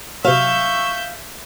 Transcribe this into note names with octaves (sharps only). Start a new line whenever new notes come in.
C3 F#3 E5 F5 C#6 E6 G6